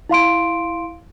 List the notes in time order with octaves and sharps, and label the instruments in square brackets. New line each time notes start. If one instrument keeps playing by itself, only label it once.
[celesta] E4 F5 C6 D7